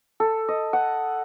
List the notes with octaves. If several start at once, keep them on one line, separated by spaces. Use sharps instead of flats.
A4
D#5
F#5